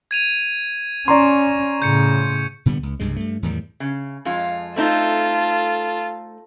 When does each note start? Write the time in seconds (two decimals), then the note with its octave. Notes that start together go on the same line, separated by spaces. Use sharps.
0.11 G#6 D#7 F7
1.08 C#4 D5 A#5 C6 C#6
1.82 A2 C#3 G6 C#7
2.66 A#2 D3 G3 B3
2.83 C#2
3.00 C2 G2 C#3 G#3
3.16 G2 A3
3.43 E2 A2 D#3 G3
3.80 C#3
4.25 F2 G#3 F4
4.76 A3 C4 D#4 F4 A4